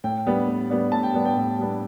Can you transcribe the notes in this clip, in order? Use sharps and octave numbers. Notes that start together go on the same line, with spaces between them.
A2 G5
G3 B3 D4
A2
G3 B3 D4
A2 A5
G5
G3 B3 D4
G5
A2
G3 B3 D4